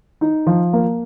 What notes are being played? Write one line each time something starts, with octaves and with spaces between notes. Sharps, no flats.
D#4
F3
A#3